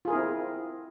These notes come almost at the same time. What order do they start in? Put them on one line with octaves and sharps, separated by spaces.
F4 G#4 A#4 E4 C4